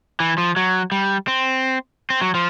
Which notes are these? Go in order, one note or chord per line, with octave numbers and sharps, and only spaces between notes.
E3
F3
F#3
G3
C4
C4
F#3
F3